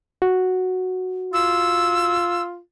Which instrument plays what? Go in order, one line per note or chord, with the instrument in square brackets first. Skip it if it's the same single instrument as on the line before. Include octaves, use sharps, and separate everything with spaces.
[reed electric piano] F#4
[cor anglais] F4 [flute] E6